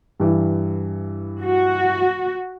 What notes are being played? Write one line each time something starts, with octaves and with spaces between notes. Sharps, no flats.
G2 E3
F#4